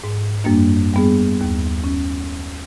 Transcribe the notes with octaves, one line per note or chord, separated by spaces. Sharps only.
G#2
F#2 G3 A#3 D4
G3 B3 G#4
D#2
C#4